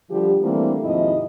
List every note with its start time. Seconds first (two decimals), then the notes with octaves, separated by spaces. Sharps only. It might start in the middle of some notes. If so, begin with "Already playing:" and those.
0.11 D3 F3 G3 G4
0.43 D3 E3 G3 A3 A#3 C4
0.84 D#2 G#2 C3 F3 E4 D#5